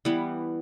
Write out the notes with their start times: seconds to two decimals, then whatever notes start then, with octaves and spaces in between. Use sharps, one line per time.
0.05 E3 G3 B3